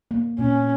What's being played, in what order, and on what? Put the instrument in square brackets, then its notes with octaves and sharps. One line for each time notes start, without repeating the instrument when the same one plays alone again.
[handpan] A#3
[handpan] A#2 [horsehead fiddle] C#4